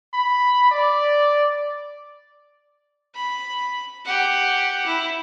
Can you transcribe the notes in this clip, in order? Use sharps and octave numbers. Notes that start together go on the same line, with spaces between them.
B5
D5
B5
G4 F#5
E4